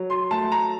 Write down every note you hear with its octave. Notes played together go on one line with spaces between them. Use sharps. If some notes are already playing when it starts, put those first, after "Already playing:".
Already playing: F#3
C6
A3 A5
A#5